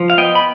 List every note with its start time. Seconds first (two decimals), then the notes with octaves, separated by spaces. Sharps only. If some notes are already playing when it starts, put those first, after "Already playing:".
Already playing: F3
0.10 F5
0.17 B3 D#5 G5
0.35 B5